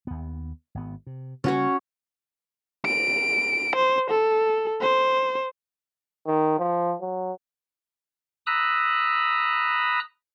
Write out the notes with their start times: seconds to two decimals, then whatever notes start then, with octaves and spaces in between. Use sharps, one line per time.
0.07 D#2 B3
0.75 G#1 B3
1.07 C3
1.44 C#3 G3 A#3 C#4 F#4 C#5
2.86 D7
3.76 C5
4.10 A4
4.81 C5
6.27 D#3
6.59 F3
7.01 F#3
8.46 A#5 B5 D#6 E6 F#6